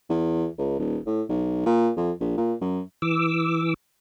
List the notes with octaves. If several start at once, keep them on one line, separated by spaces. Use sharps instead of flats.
E2
C#2
D#1
A2
B1
A#2
F2
A#1
A#2
F#2
E3 D6 E6